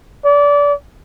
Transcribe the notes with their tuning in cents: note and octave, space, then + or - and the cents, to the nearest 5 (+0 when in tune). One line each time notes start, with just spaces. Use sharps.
D5 -25